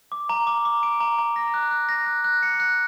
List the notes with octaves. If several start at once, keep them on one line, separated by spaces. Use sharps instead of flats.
D6
A#5
D6
D6
D7
A#5
A#5
A#6
F#6
F#6
A#6
F#6
F#6
C#7
F#6